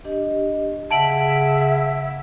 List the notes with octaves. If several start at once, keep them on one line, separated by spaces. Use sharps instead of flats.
D4 G4 D#5
C#3 E5 F#5 A5 D7 F#7